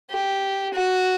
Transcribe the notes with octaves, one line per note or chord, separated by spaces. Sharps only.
G4
F#4